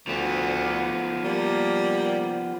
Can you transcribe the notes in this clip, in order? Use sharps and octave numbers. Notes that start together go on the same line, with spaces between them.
D2 F3 B3
G3 A#3